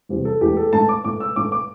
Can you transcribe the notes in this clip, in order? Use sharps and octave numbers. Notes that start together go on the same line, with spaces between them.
E2 C3 G3
A4
E2 E3 A3 G4
A4
A2 A3 A5
D6
A2 A3 D6
E6
A2 A3 D6
D6